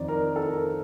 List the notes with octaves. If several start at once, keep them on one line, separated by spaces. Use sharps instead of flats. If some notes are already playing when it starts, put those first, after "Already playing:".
Already playing: F2 D#3 D5
A#4
A4
A#4